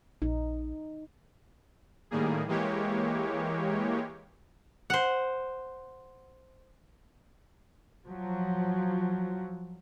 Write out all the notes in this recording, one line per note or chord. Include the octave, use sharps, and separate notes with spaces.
A#1 D#4
A2 D#3 G3 A#3 G#4
E3 G#3 A#3 G4 C#5
C5 F#5
F3 F#3